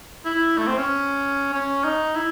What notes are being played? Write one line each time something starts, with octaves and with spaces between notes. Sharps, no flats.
E4
A3
C4
C#4
C#4
D#4
E4